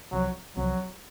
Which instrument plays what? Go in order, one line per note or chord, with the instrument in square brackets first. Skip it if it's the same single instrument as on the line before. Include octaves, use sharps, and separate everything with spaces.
[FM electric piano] C2 C3 F3 C4 [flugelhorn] F#3
[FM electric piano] C2 C3 F3 C4 [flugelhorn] F#3